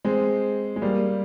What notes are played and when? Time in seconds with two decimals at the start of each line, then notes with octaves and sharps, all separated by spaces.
0.05 G#3 C4
0.76 G#3
0.82 G3 A#3